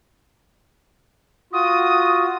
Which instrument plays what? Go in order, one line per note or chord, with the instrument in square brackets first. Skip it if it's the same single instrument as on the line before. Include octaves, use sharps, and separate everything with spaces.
[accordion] F4 F#4 [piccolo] D#6